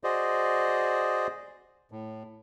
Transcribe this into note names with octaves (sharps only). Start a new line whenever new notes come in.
F#4 G#4 C5 D5 D#5
A2